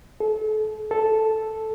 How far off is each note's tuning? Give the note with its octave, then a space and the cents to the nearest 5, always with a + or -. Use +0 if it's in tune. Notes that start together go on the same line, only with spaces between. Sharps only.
A4 -35
A4 -5